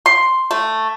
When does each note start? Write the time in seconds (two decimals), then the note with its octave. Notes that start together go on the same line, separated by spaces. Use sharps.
0.06 C6
0.51 A3